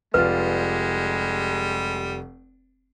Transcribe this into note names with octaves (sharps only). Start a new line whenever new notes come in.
F1 G3 G#3 F4 B4 D5